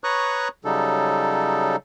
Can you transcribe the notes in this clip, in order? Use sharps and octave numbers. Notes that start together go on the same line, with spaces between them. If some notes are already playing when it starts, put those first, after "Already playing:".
B4 C#5 A#5 C#6 D#6 F#6
C#3 F#3 G3 D#4 A4